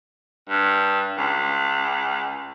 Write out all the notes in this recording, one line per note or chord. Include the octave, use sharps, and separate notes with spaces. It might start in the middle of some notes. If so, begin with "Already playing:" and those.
G2
C#2